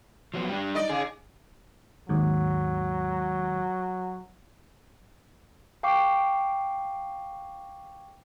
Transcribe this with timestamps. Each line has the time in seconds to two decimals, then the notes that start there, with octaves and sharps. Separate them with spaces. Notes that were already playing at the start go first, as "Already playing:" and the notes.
0.34 F3 F#3 B3
0.49 G3 D4
0.75 D#4 D5 D#5
0.89 C#3 G#4
2.09 D#2 G#2 F#3
5.83 F5 G5 C#6 D6 C7